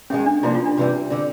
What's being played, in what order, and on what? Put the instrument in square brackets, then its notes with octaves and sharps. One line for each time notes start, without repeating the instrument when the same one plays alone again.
[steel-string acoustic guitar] G2 D#3 G#3 [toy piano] C#4
[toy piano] D4
[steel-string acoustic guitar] C3 F3 A#3 D4 [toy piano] E4
[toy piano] F4
D4
[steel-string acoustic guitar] C3 E3 G3
D3 G3 C4